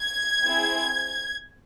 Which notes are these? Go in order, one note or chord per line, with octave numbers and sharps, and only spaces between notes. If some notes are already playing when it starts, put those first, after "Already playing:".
Already playing: G#6
C4 E4 G#4